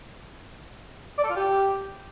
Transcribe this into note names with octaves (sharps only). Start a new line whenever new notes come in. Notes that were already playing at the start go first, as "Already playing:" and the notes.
D5
A4
F4
G4